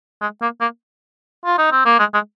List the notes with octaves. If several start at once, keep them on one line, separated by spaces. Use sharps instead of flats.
G#3
A#3
A#3
F4
D#4
C4
A#3
G#3
G#3